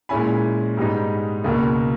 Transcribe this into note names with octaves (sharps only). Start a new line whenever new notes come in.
A#2 G#3 C#4 E4 G#5 B5
G#2 G3 B3 D#4
C#2 B2 A#3